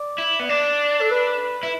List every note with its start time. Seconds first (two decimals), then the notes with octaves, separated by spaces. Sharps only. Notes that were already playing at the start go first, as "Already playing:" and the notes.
Already playing: D5
0.18 E4
0.40 B3
0.49 D4 D5
1.01 A4
1.11 B4
1.63 E4